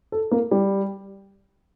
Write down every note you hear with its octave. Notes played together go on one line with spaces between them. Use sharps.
A4
A#3
G3